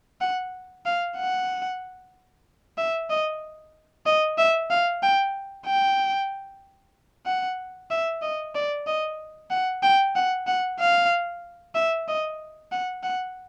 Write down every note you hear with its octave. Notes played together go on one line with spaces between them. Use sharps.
F#5
F5
F#5
E5
D#5
D#5
E5
F5
G5
G5
F#5
E5
D#5
D5
D#5
F#5
G5
F#5
F#5
F5
E5
D#5
F#5
F#5